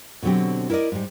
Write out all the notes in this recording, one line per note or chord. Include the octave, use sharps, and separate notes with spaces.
B2 D3 F#3 C4 G4
E4 A#4 B4 D5 D#5
G#2 G3